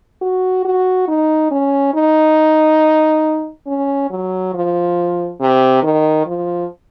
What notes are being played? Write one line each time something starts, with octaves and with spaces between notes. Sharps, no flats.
F#4
F#4
D#4
C#4
D#4
C#4
F#3
F3
C3
D#3
F3